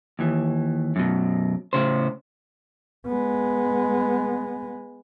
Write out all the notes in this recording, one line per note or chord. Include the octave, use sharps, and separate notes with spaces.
D#2 E3
F#2 B2
A2 C#3 C5
G#3 B3